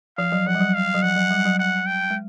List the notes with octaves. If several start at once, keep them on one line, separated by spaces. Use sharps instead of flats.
F3 F5
F#3
F3 F#5
G3
F#3
F5
F#3
F3 F#5
F#3
G3
F#3
F#5
G5
G#3